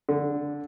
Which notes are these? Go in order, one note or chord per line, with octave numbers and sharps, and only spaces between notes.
D3